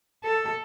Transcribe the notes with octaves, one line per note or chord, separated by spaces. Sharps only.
A4